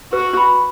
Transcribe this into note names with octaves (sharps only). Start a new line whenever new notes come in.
F#4 B4
B5